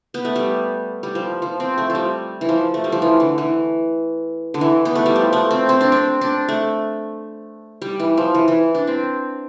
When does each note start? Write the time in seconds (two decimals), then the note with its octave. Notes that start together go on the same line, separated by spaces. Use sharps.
0.14 B3
0.25 A3
0.36 G3
1.03 G3
1.15 F3
1.42 F3
1.60 C4
1.78 A3
1.90 F3 G3
2.41 E3
2.49 F3
2.74 A3
2.84 G3
2.92 F3
3.02 E3
3.20 D3
3.38 E3
4.54 D3
4.61 E3
4.85 B3
4.95 A3
5.06 G3
5.16 F3
5.33 A3
5.51 C4
5.69 C4
5.81 D4
5.92 C4
6.21 D4
6.49 A3
7.82 G3
8.00 E3
8.17 F3
8.35 E3
8.48 E3
8.75 D4
8.87 C4